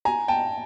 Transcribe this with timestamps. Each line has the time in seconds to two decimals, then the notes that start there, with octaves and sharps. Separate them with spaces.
0.05 G#5 A#5
0.28 G5 A5